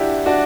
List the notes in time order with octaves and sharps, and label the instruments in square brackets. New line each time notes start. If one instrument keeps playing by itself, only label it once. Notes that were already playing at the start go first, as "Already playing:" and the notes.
Already playing: [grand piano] D4 E4 F#4 G4
D4 F#4